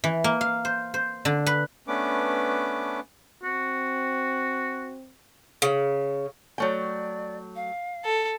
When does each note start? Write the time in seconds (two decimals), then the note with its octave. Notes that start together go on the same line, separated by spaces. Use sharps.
0.04 E3
0.24 A#3
0.41 F5
0.65 C5
0.94 C5
1.25 D3
1.46 B4
1.88 A3 B3 C#4 D4 B4 D6
3.44 C4 F#4
5.62 C#3
6.58 F#3 A3 D5 G5
7.56 F5
8.05 A4